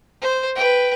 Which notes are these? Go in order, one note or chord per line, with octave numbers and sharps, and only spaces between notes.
C5
B4 G5